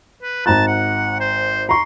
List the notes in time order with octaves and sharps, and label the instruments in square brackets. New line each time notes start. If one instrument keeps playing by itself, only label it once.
[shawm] B4
[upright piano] G#1 A#5 F#6 [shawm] A5
[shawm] F#5
C5
[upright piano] A#5 C#6 [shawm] C6